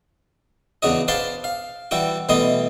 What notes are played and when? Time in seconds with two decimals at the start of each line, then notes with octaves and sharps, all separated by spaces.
0.82 E2 C#3 D4 F#4 D#5
1.08 B4 C5 D5 F5 A5 C6
1.44 F5
1.91 E3 G3 E4 F#4 G5
2.29 B2 E3 G3 A3 D#5 C6